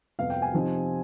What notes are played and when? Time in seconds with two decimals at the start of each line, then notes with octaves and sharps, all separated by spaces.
0.19 F2 C3 G3 B3 F5
0.30 G5
0.42 G#5
0.54 C3 F3 C4 D#4